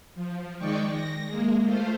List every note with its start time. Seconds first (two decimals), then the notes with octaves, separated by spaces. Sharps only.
0.15 F3
0.58 D#3 G#3 D5 G5 C#6
0.90 A#6
1.26 G#3 A#3
1.62 A3 F4 C5